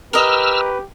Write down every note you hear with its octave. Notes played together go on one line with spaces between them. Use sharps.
G4 A#4 B4 D#5 E6 F6